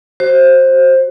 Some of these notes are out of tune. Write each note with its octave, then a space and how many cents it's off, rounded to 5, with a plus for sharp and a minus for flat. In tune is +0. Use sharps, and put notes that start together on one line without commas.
F#4 +25 C5 +15